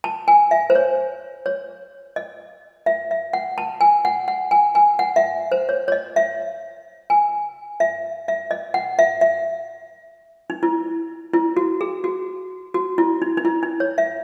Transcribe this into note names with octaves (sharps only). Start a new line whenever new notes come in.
A5
G#5
E5
C5
C#5
C#5
D#5
E5
E5
F#5
A5
G#5
F#5
F#5
G#5
G#5
F#5
E5
C5
C#5
C#5
D#5
E5
G#5
E5
E5
D#5
F#5
E5
E5
D#4
E4
E4
F#4
G#4
F#4
F#4
E4
D#4
D#4
E4
D#4
C#5
E5